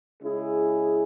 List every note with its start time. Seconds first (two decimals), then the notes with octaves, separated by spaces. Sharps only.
0.21 C#3 G#3 E4 G#4